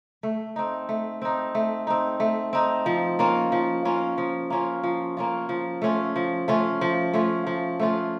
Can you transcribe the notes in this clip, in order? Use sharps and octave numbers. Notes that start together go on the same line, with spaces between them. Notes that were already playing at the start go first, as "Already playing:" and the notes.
A3
C4 D#4
A3
C4 D#4
A3
C4 D#4
A3
C4 D#4
F3
A#3 C#4 F4
F3
A#3 C#4 F4
F3
A#3 C#4 F4
F3
A#3 C#4 F4
F3
A3 C#4 F4
F3
A3 C#4 F4
F3
A3 C#4 F4
F3
A3 C#4 F4